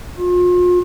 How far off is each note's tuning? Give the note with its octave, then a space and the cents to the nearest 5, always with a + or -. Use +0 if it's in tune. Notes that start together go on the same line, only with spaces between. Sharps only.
F4 +40